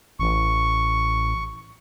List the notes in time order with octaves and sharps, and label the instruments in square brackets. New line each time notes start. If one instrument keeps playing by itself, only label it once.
[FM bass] A1 [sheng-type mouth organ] C#6